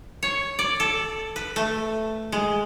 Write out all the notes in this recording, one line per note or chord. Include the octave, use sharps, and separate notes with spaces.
C#5
D5
A4
B4
A3
G#3